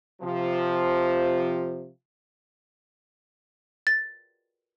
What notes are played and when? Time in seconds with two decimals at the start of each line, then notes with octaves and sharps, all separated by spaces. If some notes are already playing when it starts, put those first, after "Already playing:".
0.22 C3 F3
3.87 A6